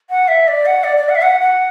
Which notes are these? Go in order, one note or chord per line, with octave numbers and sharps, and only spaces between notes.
F#5
E5
D5
F#5
D5
D5
F#5
E5
F#5
F#5